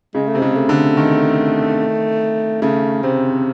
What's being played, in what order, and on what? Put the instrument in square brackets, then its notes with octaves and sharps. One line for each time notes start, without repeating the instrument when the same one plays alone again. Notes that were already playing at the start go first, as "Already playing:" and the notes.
[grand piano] C#3 [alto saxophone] G#3
[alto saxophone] A3
[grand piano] C3
[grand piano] C#3 [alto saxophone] G#3
[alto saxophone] A3
[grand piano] D3
D#3
[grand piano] C#3 [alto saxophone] A3
[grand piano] C3 [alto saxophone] C4